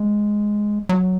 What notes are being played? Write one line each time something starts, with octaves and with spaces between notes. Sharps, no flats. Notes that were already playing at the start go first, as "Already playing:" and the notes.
Already playing: G#3
F#3